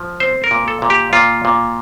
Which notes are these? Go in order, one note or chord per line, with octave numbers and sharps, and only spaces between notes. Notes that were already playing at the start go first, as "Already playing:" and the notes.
Already playing: F3
C4 C5
A#4
A#2
A4
A#2
G4
A#2 F4
A#2